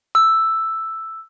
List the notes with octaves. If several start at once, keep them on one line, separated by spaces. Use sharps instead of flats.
E6